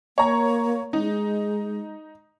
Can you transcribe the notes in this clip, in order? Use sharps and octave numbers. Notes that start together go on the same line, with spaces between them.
A#3 C#5 A#5
G#3 D#4